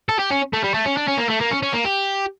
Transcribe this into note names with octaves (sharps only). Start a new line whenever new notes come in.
A4
G4
C#4
A3
G3
A3
C#4
D4
C#4
A#3
A3
A#3
C#4
C#4
A#3
G4